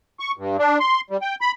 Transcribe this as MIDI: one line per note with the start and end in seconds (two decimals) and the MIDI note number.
0.20 0.31 85
0.37 0.57 43
0.59 0.78 62
0.80 1.01 84
1.10 1.17 55
1.22 1.35 79
1.41 1.51 83